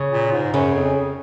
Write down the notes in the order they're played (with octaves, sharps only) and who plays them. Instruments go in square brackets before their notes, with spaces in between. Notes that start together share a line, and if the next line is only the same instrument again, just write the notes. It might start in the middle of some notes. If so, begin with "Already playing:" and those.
Already playing: [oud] C#3
[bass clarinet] A#2
G#2
[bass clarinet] F#2 [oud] C#3
[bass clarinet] F2